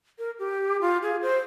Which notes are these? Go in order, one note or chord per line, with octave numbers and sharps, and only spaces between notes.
A#4
G4
F4
G#4
C5